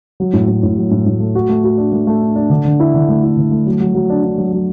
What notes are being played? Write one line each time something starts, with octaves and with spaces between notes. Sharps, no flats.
F#3
A2
A2
A2
F#3
A2
A2
A3
F#4
A3
F#4
D4
A3
A3
D4
D4
D3
D3
E4
D3
A3
E4
D3
A3
F#3
F#3
F#3
D4
D4
F#3
F#3